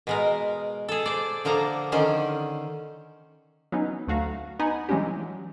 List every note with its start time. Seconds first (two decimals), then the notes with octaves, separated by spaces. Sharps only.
0.07 B2 G#3 A#4
0.89 G#4 A4
1.06 C5 D5
1.45 D3 F3 A#3 A#5
1.92 D3 D#3 C#4 C5
3.72 F#3 B3 C#4 D#4
4.08 D2 A3 F#4 F5 A#5
4.59 B3 D#4 F#5 G#5 A#5 B5
4.89 E3 F#3 G#3 C#4 D4 G4